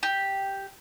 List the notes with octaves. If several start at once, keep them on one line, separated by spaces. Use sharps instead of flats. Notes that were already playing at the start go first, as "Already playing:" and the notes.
G4